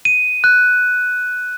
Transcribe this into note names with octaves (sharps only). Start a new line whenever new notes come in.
D#7
F#6